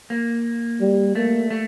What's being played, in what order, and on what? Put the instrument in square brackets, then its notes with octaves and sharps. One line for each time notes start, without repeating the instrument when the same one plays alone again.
[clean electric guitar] A#3
[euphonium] G3
[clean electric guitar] A3 [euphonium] A#3
[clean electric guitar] A3